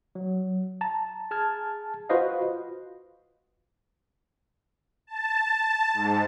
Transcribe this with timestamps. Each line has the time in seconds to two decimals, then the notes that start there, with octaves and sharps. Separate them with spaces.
0.15 F#3
0.81 A5 A#5
1.31 G#4 A5 F6 G#6
2.09 F4 F#4 B4 C5 D#5 F5
5.07 A5
5.93 G#2